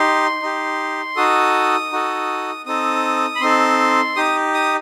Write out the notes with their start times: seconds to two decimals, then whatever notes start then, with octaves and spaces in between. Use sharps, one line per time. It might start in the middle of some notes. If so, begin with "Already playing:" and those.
Already playing: D#4 G4 C6
0.42 D#4 G4
1.16 D#4 F#4 A4 D#6
1.92 D#4 F#4 A4
2.66 C4 D#4 A4 D#6
3.35 B5
3.41 C4 D#4 A4 C6
4.16 D#4 G4 D#6
4.54 D#6